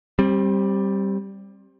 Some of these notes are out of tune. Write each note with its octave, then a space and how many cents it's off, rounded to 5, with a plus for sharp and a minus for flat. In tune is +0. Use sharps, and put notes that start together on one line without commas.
G3 +0 C4 +25